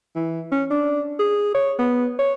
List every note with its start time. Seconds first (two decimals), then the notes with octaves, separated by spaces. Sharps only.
0.16 E3
0.52 C#4
0.70 D4
1.19 G#4
1.54 C#5
1.79 B3
2.19 C#5